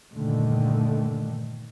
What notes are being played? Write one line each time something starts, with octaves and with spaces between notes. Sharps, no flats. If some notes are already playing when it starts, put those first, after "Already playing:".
E2 G2 A#2 D3 D#3 A3